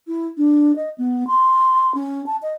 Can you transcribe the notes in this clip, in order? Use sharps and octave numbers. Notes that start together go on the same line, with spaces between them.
E4
D4
D#5
B3
C6
C#4
A5
D#5